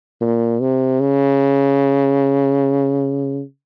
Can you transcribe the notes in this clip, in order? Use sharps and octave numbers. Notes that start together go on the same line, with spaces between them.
A#2
C3
C#3